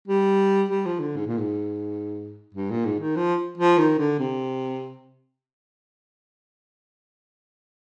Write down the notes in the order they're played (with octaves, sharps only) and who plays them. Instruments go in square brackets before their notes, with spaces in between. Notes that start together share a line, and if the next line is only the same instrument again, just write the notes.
[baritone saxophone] G3
G3
F3
D3
G#2
A#2
G#2
G2
A#2
G#2
D#3
F3
F3
D#3
D3
C3